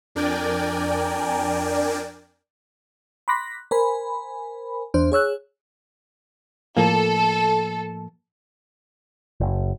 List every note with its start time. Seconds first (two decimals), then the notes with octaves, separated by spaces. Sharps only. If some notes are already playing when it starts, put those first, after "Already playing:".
0.15 F2 D4 A#4 D5 G5 G#5
3.28 B5 C6 D6 F#6 A#6 B6
3.71 A#4 C5 G#5 B5
4.94 E2 D4 C5
5.12 G#4 C#5 E6 F#6
6.77 A2 F3 A#3 A4
9.40 F#1